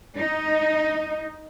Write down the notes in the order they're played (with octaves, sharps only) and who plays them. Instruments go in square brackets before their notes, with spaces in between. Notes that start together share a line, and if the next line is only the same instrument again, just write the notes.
[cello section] D#4